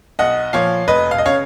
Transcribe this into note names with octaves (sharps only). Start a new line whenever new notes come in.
B1 D#5 F#5
A#2 F3 C#5 F5
F1 B4 D#5
F5
D#5
C#3 C#5 F5